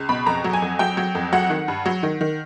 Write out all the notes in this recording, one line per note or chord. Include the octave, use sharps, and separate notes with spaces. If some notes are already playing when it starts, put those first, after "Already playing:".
Already playing: C#2
B2 B5
F2 A#5
F#3
G#5
F2
F#3 G5
F#3
F2
F#3 F#5
D#3
G2
F#3
D#3
D#3